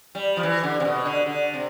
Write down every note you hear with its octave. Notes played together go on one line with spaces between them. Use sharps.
G3
F3
E3
D3
C3
B2
D3
D3
C3